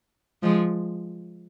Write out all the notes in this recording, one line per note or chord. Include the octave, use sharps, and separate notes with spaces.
F3 G#3